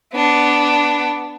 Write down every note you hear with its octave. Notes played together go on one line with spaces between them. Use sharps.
B3 D4